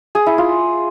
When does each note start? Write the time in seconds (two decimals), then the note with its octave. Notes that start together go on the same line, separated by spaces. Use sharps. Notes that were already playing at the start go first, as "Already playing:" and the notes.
0.15 G#4
0.26 E4
0.38 F4